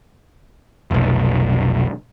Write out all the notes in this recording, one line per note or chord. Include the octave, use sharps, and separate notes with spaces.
F1 B1